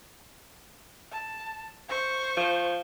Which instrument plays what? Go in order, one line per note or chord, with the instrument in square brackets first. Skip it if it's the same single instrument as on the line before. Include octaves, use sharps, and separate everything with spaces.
[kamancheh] A5
C5 C#6
[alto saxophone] F3